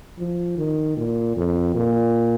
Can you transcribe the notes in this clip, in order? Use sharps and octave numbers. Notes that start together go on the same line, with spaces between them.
F3
D#3
A#2
F2
A#2